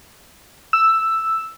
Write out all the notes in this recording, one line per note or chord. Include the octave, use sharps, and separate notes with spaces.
E6